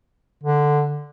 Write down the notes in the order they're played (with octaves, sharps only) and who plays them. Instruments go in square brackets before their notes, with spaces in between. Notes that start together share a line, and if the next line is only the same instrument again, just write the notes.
[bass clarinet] D3